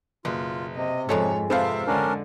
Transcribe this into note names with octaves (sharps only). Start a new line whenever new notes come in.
F#1 B2 F4
C3 D#5
F2 G#2 G#3 C#4 A4 C#5
C3 B3 C4 F4 A4 C5 E5 F5
D3 G#3 C#4 D4 A#4